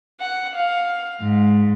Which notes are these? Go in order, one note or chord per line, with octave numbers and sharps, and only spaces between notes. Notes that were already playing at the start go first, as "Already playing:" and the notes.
F#5
F5
G#2